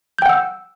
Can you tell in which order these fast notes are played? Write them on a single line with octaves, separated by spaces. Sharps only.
G6 G5 F#5 E6